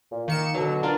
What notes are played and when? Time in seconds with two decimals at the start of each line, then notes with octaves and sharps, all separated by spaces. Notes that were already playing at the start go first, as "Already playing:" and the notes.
0.11 A#2
0.28 D#3 A#3 C#7 E7
0.54 B2 D3 F#3
0.83 D4 F4 A#4